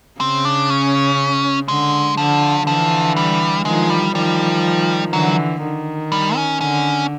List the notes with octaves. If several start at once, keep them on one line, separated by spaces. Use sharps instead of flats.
C#3 C4
D4
C#4
D3 G#3
D3 F3
D3 E3 F3
G3
D#3 F3 G#3
G3
D#3 F3 G3
D3 E3 F#3
D#3
G3
C#4
D3 C#4